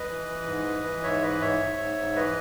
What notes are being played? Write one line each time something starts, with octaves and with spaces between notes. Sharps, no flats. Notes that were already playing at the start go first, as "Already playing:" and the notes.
Already playing: B4 D#5
E3
E3
G#2
E3
E3
G#2 C#5 E5
E3 B4 D#5
G#2 C#5 E5
G#2
G#2
G#2
E3 B4 D#5